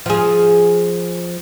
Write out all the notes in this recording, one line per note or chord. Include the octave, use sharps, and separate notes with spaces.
F3 G#4